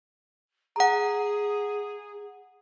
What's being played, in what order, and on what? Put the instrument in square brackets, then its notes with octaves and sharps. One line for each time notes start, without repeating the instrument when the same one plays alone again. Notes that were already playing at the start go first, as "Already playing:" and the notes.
[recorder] G#4 [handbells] F#5 A#5